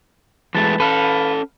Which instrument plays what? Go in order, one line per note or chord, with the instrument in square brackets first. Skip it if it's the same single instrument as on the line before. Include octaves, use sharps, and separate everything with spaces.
[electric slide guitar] E3 G#3 A3 [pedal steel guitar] B4 A5
[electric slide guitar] C#4 A4 [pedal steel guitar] B4 F5 F#5